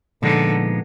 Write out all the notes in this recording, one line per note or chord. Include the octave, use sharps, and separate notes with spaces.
A#2 D3 F3 G#3 B3 D#4